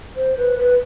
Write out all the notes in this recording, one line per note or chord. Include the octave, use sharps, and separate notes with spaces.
C5
B4
B4